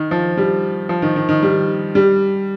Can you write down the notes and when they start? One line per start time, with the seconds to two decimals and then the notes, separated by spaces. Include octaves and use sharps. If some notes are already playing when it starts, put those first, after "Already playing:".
Already playing: D#3
0.11 F3
0.37 G3
0.89 F3
1.02 D#3
1.16 D#3
1.29 D#3
1.43 G3
1.95 G3